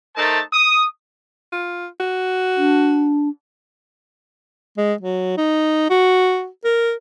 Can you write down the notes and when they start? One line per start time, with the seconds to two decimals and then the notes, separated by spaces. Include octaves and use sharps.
0.16 A3 D#4 A#4 C5 A5
0.53 D#6
1.53 F4
2.00 F#4
2.57 D4
4.78 G#3
5.01 F#3
5.37 D#4
5.90 F#4
6.65 A#4